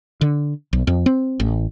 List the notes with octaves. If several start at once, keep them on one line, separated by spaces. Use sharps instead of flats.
D3
B1
F2
C4
A1